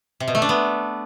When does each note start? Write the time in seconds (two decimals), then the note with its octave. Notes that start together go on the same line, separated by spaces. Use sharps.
0.20 C3
0.28 B2
0.35 A3
0.42 D4
0.49 B3